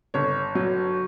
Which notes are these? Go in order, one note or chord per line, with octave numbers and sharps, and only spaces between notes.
G1 C#5
F#3